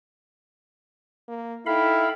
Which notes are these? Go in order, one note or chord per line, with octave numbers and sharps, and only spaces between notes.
A#3
D#4 E4 A4 F5 G5 B5